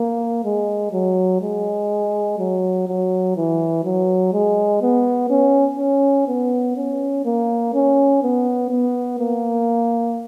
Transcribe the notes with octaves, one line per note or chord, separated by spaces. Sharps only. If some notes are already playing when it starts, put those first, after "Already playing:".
Already playing: A#3
G#3
F#3
G#3
F#3
F#3
E3
F#3
G#3
B3
C#4
C#4
B3
C#4
A#3
C#4
B3
B3
A#3